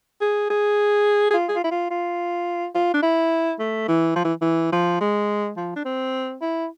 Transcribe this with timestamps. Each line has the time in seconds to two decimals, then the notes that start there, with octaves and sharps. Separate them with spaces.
0.21 G#4
0.50 G#4
1.31 G#4
1.34 F4
1.48 G#4
1.56 F4
1.64 E4
1.71 F4
1.91 F4
2.75 F4
2.94 D4
3.03 E4
3.59 A3
3.88 E3
4.16 F3
4.25 E3
4.42 E3
4.72 F3
5.01 G#3
5.57 F3
5.76 D4
5.85 C4
6.41 E4